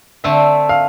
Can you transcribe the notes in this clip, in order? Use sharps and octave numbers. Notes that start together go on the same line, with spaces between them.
D3 A3 C4 E5
F5